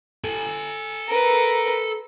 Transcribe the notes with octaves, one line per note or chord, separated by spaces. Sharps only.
A4 G#5
A#4 B4